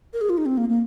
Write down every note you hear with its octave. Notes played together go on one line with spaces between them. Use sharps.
A#4
G#4
F4
D#4
C4
A#3
A#3